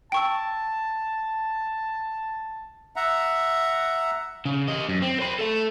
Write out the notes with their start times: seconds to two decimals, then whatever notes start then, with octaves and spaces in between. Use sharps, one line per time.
0.12 G5 A5 C#6 E6
2.96 E5 F#5 A#5
4.45 C#3
4.68 G4 D#5
4.89 F#2
5.02 C4
5.20 C5 B5
5.39 A4 E5